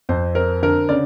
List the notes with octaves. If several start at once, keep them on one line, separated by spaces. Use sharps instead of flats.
F2 C5
C4 A#4
D3 A#4
C#3 D5